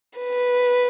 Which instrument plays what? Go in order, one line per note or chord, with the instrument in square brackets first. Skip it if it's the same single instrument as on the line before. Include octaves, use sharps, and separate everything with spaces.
[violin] B4